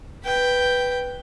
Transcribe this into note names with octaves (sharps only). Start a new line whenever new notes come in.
B4 G5